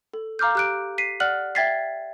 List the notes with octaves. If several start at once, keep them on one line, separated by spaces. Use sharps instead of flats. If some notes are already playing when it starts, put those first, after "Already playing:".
A4
F5 A#5 D6 F6 G6
G4 F#6 D7
B6 C7 D#7
D5 F#5 F6 F#6 F#7
E5 G5 G#6 A6 B6 C7